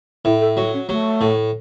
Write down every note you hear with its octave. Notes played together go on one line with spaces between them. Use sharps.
A2 E4
A4
F#3 F#4
C#4
F#3 A3
A2